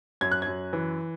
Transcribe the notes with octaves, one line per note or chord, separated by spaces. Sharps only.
F#2 G#6
F#6
F#2 G#6
E3